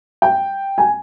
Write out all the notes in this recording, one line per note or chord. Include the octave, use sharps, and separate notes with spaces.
G5
G#5